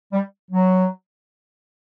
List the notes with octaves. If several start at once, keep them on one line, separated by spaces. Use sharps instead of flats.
G3
F#3